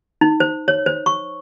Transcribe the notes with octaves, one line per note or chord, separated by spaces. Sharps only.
D#4
C5
C#5
C5
C#6